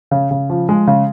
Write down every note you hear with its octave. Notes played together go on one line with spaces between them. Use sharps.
C#3
C#3
F3
G#3
C#3